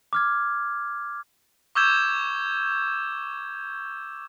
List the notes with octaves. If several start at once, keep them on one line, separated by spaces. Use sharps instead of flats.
D6 F6 G#6
C#6 D6 E6 G6 G#6 E7